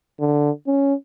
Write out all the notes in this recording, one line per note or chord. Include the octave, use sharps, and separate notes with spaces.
D3
C#4